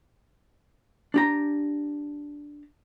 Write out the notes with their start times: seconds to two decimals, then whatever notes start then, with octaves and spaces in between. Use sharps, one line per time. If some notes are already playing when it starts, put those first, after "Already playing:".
1.14 D4 G4 A#5